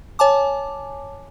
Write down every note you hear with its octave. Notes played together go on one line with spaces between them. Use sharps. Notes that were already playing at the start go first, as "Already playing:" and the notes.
C#5 G#5 A5 D6